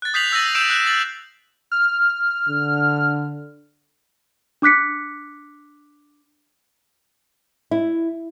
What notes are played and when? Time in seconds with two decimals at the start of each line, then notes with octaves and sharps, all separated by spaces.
0.02 F#6 A6
0.14 D#6 G6 B6 C7 F7 F#7
0.32 E6 G6 A6 A#6 D#7 F#7
0.55 E6 G6 C7 D7 E7
0.70 F#6 G6 E7
0.86 A6 F#7
1.72 F6
2.49 D3
4.62 D4 D6 F#6 B6 C#7
7.71 E4